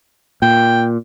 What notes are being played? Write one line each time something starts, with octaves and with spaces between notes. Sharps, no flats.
A#2 G5